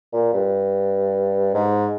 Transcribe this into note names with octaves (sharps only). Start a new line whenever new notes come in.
A#2
G2
G#2